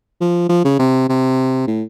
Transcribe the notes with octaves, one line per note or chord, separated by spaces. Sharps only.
F3
F3
C#3
C3
C3
A2